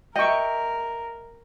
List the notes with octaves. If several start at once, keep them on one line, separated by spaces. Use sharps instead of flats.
A#4 D#5 E5 G5 C#6